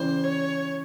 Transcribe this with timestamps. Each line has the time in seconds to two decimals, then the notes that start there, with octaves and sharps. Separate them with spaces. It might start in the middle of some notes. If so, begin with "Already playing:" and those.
Already playing: C#3 E3 G3 C5
0.24 C#5